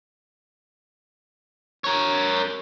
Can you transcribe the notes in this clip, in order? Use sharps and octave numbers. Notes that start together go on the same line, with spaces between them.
A#4 C#5